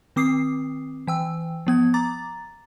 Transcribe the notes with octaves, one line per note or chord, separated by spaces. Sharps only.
D#3 C4 D6 D#6 C7
E3 G5 E6
F3 B3 G#6
A#5 D6 A6